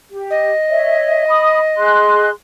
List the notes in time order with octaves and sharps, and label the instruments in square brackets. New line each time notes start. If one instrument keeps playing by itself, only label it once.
[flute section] G4
[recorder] D#5
[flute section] C#5 E5
B5 D#6
G#4 C6 F#6